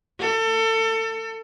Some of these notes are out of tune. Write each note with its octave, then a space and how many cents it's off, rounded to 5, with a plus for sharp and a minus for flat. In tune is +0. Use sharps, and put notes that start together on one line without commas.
A4 +30